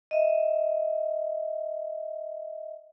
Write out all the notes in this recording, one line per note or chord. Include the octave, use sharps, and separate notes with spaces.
D#5 E5